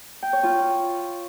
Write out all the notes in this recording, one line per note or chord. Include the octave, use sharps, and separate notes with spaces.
G5
C#5
F4